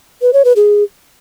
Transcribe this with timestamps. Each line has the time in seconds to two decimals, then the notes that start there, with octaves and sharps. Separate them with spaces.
0.22 B4
0.33 C#5
0.45 B4
0.56 G#4